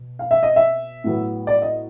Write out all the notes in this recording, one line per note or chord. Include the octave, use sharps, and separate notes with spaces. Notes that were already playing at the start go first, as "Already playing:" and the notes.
Already playing: B2
F5
E5
D#5
E5
A2 F#3 B3
D5
D#5